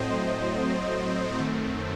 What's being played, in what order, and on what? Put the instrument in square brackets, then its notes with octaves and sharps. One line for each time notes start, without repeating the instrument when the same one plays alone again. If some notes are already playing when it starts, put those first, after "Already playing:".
Already playing: [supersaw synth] A2 F#3 A3 C4 C5 D#5
F#2 D#3 A3 C4